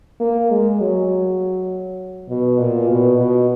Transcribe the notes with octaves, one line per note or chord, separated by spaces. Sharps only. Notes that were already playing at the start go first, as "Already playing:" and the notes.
A#3
G#3
F#3
B2
A#2
B2
B2